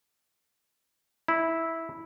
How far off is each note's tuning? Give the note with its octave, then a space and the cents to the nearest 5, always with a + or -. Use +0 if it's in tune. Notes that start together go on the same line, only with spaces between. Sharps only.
E4 -10